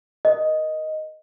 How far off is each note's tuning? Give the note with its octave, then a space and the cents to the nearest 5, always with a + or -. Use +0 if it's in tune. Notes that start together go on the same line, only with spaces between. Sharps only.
A#4 +25 D#5 +0